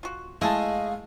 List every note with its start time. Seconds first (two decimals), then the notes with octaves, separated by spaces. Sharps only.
0.03 F4 F#4
0.41 G#3 A3 E4 G#4 D#5 F5 A5